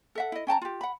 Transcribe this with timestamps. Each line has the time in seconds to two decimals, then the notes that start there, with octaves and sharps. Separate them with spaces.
0.15 A4 E5 F#5
0.32 E4 D#5
0.47 C#4 G5 A5 A#5
0.62 F4 G4
0.81 F#5 B5